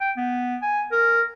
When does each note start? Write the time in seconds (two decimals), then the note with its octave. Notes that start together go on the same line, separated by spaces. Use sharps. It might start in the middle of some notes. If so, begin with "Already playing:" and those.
0.01 G5
0.17 B3
0.62 G#5
0.92 A#4